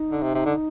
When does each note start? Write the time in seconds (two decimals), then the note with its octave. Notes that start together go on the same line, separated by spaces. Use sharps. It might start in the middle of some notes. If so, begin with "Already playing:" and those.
Already playing: D#4
0.12 D3
0.22 C3
0.35 C3
0.45 D3